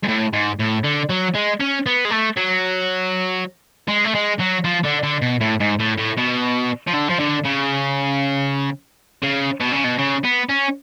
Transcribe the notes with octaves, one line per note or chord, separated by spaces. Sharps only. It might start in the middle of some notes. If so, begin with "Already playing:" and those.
G#2
A2
G#2
A2
D3
F#3
G#3
C#4
B3
G#3
A3
F#3
G#3
A3
G#3
F#3
F3
D3
D3
B2
A2
G#2
A2
A2
B2
F3
D3
F3
D3
C#3
C#3
B2
C#3
B2
C#3
B3
C#4